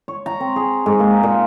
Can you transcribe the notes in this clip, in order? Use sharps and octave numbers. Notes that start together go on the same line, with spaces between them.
C#5
A#5
C4
G#4
G#2
A#3
G#5
A#2